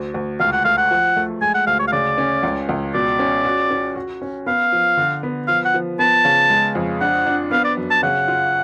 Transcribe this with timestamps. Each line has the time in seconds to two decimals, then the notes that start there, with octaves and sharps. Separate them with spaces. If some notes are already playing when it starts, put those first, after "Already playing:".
Already playing: D2
0.14 D2
0.40 C#2 F5
0.53 F#5
0.65 A3 F5
0.78 F#5
0.91 F3
1.16 A3
1.41 G#3 G#5
1.54 F#5
1.67 D2 F5
1.79 C#5
1.87 F5
1.92 C#3 D5
2.18 C#4
2.43 C#2
2.69 C#2
2.94 B2 D5
3.19 C#4
3.45 F#4
3.70 C#4
3.96 F#4
4.22 C#4
4.46 B3 F5
4.72 F3
4.97 D3
5.23 B3
5.48 F3 F5
5.65 F#5
5.74 F3
5.99 B3 A5
6.25 C#3
6.50 G#3
6.75 F2
7.01 D4 F#5
7.27 D4
7.51 B3 F5
7.64 D5
7.77 F#2
7.91 A5
8.03 C#3 F#5
8.28 F4